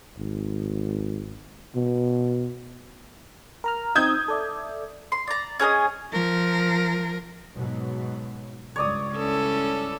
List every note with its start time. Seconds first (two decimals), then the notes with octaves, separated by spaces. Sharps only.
0.18 G#1
1.75 B2
3.64 A#4 A#5 F6
3.95 C4 D#4 D#6 E6 G6 G#6
4.28 A4 D5 E5
5.12 C6
5.27 D5 A#5
5.60 C#4 G#4 B4 D#5
6.12 F3 A#4
7.55 G#2 B2 F#3
8.76 C#2 G2 C#5 D5 D#6
9.14 C#4 E4 A4